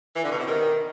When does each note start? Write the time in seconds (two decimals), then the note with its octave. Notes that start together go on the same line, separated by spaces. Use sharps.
0.16 E3
0.24 D3
0.31 B2
0.39 C3
0.47 D#3